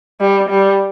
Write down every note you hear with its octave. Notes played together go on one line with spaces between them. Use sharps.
G3
G3